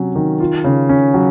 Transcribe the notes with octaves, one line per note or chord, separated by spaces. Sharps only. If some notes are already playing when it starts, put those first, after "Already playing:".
Already playing: C3 F#3 C#4
D#3
F4
C#3
C#4
F#3